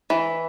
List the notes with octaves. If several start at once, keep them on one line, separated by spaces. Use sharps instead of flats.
E3